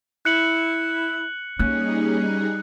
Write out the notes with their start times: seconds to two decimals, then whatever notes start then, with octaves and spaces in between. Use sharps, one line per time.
0.25 E4 F#6 C#7 F#7
1.59 G3 A#3 C#4 D#4 G#4 F#6